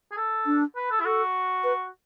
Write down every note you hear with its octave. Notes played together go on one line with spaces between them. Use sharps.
G#4
A4
D4
B4
A4
E4
F#4 A4
B4